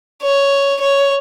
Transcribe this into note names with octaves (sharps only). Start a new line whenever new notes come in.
C#5
C#5